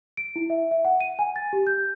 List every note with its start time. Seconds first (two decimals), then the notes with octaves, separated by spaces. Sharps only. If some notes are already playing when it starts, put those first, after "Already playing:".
0.17 D7
0.36 E4
0.50 E5
0.71 E5
0.85 F#5
1.00 D#7
1.19 G#5
1.36 A6
1.53 G4
1.67 G6